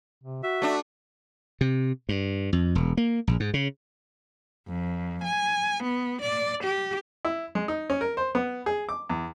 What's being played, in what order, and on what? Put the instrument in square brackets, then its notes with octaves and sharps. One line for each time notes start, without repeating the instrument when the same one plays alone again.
[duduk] C3
[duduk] F#4 [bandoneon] E5
[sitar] A3 D4
[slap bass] C3
G2
F2
E1
A#3
A#1
G#2
C#3
[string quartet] F2
G#5
B3
D5
G4
[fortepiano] E4
G#3
D#4
C#4
A#4
C5
B3
G#4
D6
E2